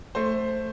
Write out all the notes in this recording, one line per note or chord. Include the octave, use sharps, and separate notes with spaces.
A3 C5